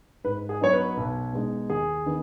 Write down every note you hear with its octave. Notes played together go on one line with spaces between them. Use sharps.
G#2 B4
G#4
F#3 B3 D#4 C#5
B4
B1
B2 G#3 D#4
D#2 G#4
D#3 B3 D#4